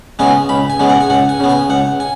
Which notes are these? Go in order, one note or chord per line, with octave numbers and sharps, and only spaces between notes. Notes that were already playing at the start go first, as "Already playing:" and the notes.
C#3 G#3 B3 G#5
C#2 B5
G#5
C#3 G#3 B3
F#5
G#5
C#2 F#5
G#5
C#3 B3
G#5
C#2 F#5
G#5